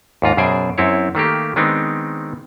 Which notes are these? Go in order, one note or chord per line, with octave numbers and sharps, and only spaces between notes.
D#2 G#2 F4 A#5
F#2 B2 G#4 C5 D5 G#5
F#2 C4 E4 C#5
D#3 A3 A#3 G4
D#3 G#3 B3 C4 D4 D#4